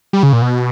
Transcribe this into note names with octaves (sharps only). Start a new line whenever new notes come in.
G3
C#3
A#2
B2